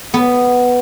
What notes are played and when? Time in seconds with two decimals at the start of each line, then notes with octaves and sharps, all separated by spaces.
0.14 B3